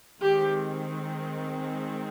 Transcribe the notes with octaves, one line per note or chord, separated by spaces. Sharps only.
D#3 G#3 C4 G4